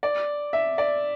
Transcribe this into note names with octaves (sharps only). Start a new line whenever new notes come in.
D5
E5
D5